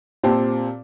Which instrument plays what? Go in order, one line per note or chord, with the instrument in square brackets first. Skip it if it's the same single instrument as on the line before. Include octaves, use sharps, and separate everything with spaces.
[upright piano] A#2 C4 G4 A5